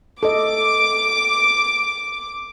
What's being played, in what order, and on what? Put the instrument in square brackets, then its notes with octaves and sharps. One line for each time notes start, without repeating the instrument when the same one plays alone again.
[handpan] A4 D#5 [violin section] D6